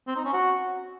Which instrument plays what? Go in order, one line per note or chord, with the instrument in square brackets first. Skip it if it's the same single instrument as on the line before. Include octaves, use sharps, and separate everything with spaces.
[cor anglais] C4
D#4
C#4
F#4